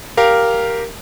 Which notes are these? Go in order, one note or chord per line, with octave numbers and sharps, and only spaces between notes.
G4 A#4 F5